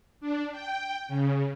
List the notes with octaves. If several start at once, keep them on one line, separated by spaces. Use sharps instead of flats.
D4
G5
C#3